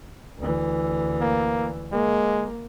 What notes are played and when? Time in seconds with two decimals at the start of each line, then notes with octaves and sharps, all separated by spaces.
0.39 D2 E3
1.21 A#3
1.92 G#3 A#3